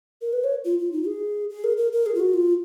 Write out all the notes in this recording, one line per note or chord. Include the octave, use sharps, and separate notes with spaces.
A#4
B4
C#5
F4
F4
D#4
G#4
G#4
A#4
A#4
A#4
G#4
F4
F#4
F4